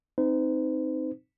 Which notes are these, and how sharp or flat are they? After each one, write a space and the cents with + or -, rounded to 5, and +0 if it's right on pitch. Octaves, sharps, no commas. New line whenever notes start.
C4 +0 D#4 +0 C5 -45